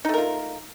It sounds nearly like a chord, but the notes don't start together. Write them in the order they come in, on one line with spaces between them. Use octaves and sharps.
D#4 A3 A#4 F4